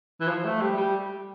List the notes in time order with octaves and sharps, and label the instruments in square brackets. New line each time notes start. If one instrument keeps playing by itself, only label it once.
[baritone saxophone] E3
F3
A3
G3
G3